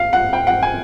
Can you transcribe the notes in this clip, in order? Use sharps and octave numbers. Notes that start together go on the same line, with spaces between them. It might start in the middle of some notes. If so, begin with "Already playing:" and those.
Already playing: F5
F#5
G5
F#5
G#5